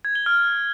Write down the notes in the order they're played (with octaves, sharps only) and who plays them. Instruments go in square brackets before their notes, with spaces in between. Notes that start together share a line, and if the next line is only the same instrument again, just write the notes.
[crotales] G#6
G7
F6